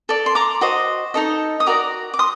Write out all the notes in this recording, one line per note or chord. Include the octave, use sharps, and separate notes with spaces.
A4 D5
C6
A#5 D6
F#4 C5 D#5
D#4 A4 D#5
D#6
F#4 A#4 D5 A#5 D6
D6
C6 D#6